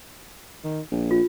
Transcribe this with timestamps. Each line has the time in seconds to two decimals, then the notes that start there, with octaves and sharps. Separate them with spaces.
0.64 D#3
0.92 A#1
1.11 F4